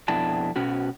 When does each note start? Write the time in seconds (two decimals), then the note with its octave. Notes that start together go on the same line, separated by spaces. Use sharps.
0.08 F2 B2 D4 E4 A5
0.56 B2 C#4 F#4